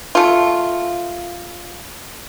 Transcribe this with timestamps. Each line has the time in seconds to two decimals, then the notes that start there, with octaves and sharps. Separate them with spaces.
0.15 A3 F4